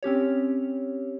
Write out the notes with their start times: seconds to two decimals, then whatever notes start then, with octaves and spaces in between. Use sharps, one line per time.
0.03 C4 C#4 G4 C#5